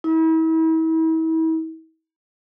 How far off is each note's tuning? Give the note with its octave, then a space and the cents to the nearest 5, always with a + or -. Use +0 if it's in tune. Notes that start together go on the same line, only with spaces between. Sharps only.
E4 -40